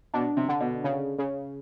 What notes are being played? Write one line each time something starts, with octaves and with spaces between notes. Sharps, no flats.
B2 D4
C3
D3
B2
C#3
C#3